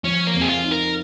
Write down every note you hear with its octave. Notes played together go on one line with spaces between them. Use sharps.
F3 C#4
A#3
F2
G#4
F4
D#4
A#4